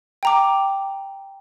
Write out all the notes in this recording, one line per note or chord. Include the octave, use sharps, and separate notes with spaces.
G5 A#5 D6